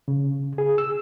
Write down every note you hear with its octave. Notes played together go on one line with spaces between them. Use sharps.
C#3
G#4
E6